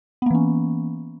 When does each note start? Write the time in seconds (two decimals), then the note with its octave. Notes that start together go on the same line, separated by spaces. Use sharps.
0.22 B3
0.26 A#3
0.30 E3
0.35 C#4